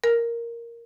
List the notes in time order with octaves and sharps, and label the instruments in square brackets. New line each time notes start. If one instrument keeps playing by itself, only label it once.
[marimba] A#4